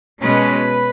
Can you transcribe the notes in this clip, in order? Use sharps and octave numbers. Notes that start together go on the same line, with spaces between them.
B2 G#3 C#4 B4